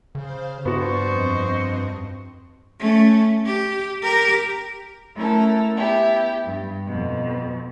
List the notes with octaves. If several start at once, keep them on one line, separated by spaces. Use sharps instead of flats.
C#3 C5 F5
G2 B3 F#4 C5 D5 C#6
F2 C4 D#5
A3 C#4
G4
G4 A#4
A3 C#4 E4 A4 A#4
B3 E4 G4
G2
F2 B2